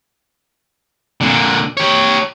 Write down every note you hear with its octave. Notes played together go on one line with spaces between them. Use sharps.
A#2 D3
G4 C#5